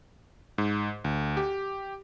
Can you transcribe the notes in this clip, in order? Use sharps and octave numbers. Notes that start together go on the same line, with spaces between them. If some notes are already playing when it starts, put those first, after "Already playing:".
G#2
D2
G4